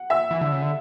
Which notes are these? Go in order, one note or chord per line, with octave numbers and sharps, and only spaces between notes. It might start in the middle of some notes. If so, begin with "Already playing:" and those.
Already playing: F#5
E5
E3
D3
C#3
D3